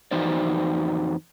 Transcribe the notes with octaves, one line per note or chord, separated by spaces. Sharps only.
F2 E3 D#4 F#4 C5 D5